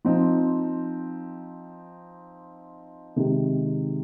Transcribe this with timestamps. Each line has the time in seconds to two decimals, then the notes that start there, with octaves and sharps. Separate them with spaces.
0.05 F3 C4 D#4
3.16 C3 D#3 G#3